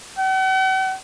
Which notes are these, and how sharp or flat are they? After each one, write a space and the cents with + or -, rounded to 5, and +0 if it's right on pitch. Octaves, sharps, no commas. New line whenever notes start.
F#5 +45